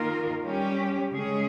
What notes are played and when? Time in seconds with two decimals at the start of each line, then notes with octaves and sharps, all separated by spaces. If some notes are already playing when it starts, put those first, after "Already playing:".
Already playing: D#3 A#3 F4 A#4
0.43 G3 C#4 G4
1.12 C#3 G#3 C#4 G#4